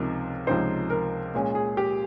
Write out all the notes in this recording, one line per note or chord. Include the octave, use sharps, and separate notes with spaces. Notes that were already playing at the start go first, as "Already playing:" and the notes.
Already playing: C#2 C3 F3 C4 D#4 A#4
C#2 C3 F3 C4 D#4 C5
A#4
A#2 G#3 C#4
G#4
G4